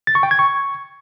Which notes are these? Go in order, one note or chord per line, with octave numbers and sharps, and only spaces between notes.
A6
C#6
G5
G#6
C#6